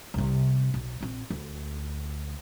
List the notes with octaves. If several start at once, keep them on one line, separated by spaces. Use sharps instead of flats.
C2 C3
B1
A#1 C4
D2